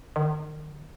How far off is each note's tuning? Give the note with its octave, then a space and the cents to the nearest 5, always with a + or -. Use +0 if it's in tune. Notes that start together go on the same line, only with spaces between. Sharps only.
D#3 -35